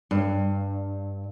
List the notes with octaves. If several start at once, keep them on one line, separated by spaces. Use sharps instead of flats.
G2